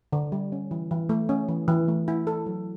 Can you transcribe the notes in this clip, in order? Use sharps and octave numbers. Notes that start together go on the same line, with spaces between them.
D3
G3
C#4
E3
E3
A3
C#4
E3
E3
A3
E4
A4
F#3